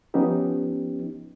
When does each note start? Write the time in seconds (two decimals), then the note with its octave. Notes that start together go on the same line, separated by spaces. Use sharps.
0.14 F3 B3 C#4 D#4 G4